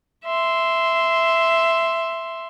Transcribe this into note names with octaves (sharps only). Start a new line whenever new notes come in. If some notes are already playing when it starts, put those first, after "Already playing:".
E5 C6